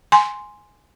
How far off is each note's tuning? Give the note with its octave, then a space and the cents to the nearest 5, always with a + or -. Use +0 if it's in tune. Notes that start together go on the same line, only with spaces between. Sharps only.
G#5 +0 C6 +0